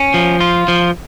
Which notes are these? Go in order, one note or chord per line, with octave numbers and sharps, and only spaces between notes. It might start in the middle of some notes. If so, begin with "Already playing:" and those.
Already playing: C#4
F3
F4
F3